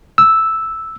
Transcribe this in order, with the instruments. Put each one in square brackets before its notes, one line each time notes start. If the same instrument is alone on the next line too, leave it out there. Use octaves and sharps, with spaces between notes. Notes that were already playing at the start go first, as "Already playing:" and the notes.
[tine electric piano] E6